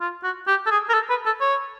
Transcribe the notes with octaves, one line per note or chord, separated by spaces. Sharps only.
F4
F#4
G4
A4
G#4
A#4
A4
B4
A4
C#5